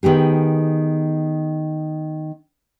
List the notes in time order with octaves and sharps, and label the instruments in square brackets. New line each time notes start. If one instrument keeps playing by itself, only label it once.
[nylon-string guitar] D#3 B3 G4 G#4